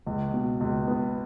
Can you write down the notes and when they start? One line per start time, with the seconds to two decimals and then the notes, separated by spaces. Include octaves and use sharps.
0.06 C#2
0.34 B2
0.60 C#2
0.88 B3